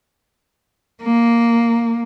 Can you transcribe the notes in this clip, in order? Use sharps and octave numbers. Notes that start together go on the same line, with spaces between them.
A#3